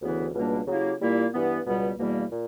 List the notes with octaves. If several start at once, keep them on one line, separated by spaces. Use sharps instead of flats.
D2 C#3 E3 B3 E4
C#2 B2 G3 A#3 D4
C#3 F#3 A#3 E4 G4
A#2 G3 A#3 E4
G2 E3 B3
C#2 B2 G3 B3
E2 B2 G3 A#3
A#2